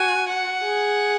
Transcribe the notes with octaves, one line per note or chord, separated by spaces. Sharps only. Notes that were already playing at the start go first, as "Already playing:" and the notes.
Already playing: F#4 G#5
F#5
G#4